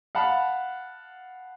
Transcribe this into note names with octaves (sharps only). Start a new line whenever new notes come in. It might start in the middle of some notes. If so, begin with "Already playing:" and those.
F5 F#5 A5 B5